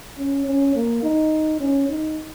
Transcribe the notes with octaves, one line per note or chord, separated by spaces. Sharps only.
C#4
C#4
A#3
D#4
C#4
D#4